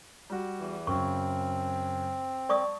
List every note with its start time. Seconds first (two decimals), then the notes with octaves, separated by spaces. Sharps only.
0.30 G3 F#4
0.60 E2 E3
0.87 F#2 C#3 C4 C#6
2.49 D5 A5 C#6 D#6